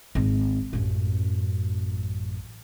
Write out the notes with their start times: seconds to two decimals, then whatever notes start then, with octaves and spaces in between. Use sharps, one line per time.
0.15 G#1
0.73 A1 F#2